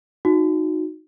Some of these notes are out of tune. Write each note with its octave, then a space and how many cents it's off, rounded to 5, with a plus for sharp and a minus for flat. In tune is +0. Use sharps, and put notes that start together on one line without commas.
D#4 +0 F#4 -20